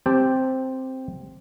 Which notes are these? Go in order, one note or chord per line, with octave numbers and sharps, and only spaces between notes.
C4 G4 G5 A5